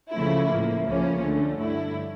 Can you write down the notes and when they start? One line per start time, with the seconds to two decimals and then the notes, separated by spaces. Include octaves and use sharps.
0.13 C#2 C#3 F3 A3 E4
0.49 A2 F3 A#3
0.86 C#2 C#3 F3 A#3 C#4
1.22 D2 D3 A3
1.57 G2 D3 A3 E4